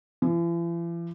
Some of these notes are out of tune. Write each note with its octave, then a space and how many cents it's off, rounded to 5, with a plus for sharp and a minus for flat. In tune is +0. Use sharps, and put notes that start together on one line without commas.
E3 +45